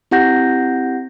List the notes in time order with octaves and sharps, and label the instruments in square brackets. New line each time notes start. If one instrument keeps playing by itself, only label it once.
[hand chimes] C4 E4 G4 F#5 G6 A#6